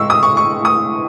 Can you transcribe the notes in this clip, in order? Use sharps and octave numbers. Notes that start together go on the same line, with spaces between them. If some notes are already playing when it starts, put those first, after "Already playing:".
Already playing: A2 G#3 C#6 E6
D#6
C#6
C#6
D#6